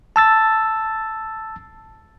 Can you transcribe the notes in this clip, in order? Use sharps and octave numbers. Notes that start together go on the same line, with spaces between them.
A5 E6 A6